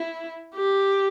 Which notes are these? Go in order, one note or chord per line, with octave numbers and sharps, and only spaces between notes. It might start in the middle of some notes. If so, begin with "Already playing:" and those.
Already playing: E4
G4